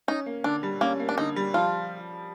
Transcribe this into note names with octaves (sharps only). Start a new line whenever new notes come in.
C#4 D#4
A#3
D3 D4
G3
A#3 C#4
A#3
D4
D3 D#4
G3
F3 F4